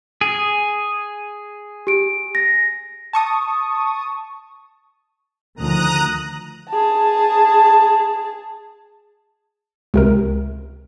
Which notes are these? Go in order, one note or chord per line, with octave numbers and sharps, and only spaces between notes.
G#4
G4 D7
A#6
A5 C#6 D#6
D2 D#3 F3 A#5 D#6 F#6
G#4 A5
C#2 C3 A#4